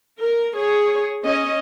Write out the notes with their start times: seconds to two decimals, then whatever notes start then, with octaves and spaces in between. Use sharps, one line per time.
0.20 A#4
0.56 G#4 C#5
1.24 C#4 D#5